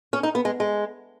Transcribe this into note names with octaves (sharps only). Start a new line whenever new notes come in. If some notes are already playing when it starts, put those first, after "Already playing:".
C#4
D#4
B3
G#3
G#3